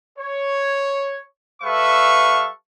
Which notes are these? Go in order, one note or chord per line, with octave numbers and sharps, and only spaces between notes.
C#5
G3 A4 B4 E5 F5 C#6